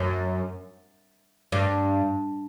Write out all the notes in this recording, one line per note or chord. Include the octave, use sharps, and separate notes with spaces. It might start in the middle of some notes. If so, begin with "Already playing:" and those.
Already playing: F#2
G2